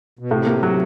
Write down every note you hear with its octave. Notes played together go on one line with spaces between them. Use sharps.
B2
A2 C3
A#3
F#3